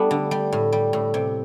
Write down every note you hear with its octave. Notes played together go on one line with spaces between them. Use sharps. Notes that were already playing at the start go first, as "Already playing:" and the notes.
Already playing: G3 A3 B3 D4
D3
G3
A2
G3
A2
C3